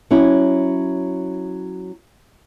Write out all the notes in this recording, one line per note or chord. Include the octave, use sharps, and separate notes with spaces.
F#3 C#4 E4